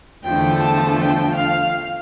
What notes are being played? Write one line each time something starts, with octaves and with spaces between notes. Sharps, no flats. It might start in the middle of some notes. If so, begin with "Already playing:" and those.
E2 D3 F3 A3 G5
A5
G5
F5